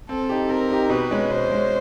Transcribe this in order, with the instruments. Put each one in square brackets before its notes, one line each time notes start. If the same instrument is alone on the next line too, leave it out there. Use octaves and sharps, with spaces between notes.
[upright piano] C4 [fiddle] A4
[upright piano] D#4 G4
[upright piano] C4 [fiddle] A#4
[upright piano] D#4 G4
[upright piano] B2 [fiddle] B4
[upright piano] G#3 C#4
[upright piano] B2 [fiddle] C5
[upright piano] G#3 C#4